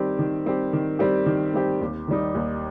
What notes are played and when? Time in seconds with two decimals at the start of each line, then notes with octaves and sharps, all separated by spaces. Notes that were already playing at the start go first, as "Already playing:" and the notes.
Already playing: D#3 G3 C4 G4
0.19 D#3
0.46 G3 C4 G4
0.73 D#3
0.99 G3 C4 G4
1.26 D#3
1.54 G3 C4 G4
1.81 D#2
2.08 D#3 G3 D#4
2.35 D#2